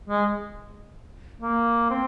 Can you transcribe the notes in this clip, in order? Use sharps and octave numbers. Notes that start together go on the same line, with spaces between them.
G#3
A#3
C4